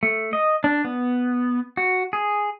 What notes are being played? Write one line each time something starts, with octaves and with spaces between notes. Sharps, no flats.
A3
D#5
D4
B3
F#4
G#4